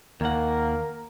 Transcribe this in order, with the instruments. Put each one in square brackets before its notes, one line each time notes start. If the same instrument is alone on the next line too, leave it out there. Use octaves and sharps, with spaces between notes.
[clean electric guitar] D#2 F#5 [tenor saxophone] A#3 [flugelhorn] A#4